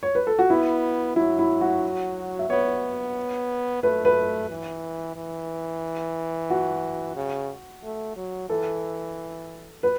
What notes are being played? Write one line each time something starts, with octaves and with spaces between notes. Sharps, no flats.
C#5
B4
A4
F#4
B3 E4
F#3 E4
E4
F#4
E5
B3 C#5
A3 B4
B4
E3
E3
F#4
C#3
A3
F#3
E3 A4
B4